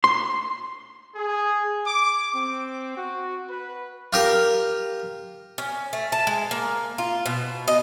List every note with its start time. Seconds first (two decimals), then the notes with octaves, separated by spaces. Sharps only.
0.04 C6
1.15 G#4
1.87 D6
2.33 C4
2.96 F#4
3.49 B4
4.13 F4 G4 A#4
5.58 C#4
5.93 A3
6.12 A5
6.27 G#3
6.51 A#3
6.98 F4
7.26 B2
7.68 D#5